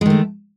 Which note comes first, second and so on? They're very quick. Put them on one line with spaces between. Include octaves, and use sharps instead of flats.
G#3 D#3 A3